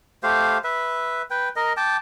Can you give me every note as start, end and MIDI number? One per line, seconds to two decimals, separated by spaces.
0.23 0.58 57
0.23 0.58 67
0.23 0.58 72
0.23 0.58 77
0.64 1.22 71
0.64 1.22 76
1.30 1.49 71
1.30 1.49 79
1.56 1.73 70
1.56 1.73 75
1.77 1.97 79
1.77 1.97 81
1.77 1.97 86